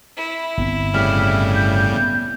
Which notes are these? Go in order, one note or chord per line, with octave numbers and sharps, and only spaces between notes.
E4
G1 B3 C4
A2 C#3 G3 F6
G6
B3